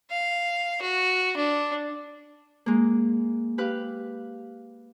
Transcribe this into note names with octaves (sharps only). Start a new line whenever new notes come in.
F5
F#4
D4
G#3 A#3
G4 B4 F5